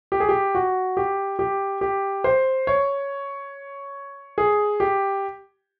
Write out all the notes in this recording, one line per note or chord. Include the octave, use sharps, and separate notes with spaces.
G4
G#4
G4
F#4
G4
G4
G4
C5
C#5
G#4
G4